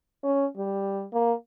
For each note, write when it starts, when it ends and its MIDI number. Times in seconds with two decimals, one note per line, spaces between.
0.23 0.45 61
0.57 1.04 55
1.13 1.32 58